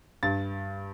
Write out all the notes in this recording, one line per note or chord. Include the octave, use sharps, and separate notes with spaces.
G2 A6